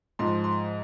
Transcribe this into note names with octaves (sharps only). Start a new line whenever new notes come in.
G#2 F3 C6
C6